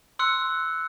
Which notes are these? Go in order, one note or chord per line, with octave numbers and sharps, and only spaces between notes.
C6 E6 F#6 C#7